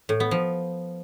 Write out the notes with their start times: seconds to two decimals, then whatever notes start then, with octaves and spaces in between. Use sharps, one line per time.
0.09 A2
0.20 B3
0.31 F3